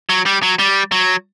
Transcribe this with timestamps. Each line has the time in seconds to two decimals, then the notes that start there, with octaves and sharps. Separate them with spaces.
0.09 F#3
0.26 G3
0.43 F#3
0.59 G3
0.92 F#3